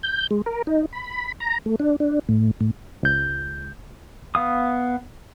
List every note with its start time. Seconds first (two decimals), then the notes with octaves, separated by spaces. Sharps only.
0.03 G6
0.31 G#3
0.46 A#4
0.67 D#4
0.93 B5
1.40 A#5
1.66 A3
1.80 D4
2.00 D4
2.29 A2
2.61 A2
3.03 C#2 G6
4.35 B3 F5 D#6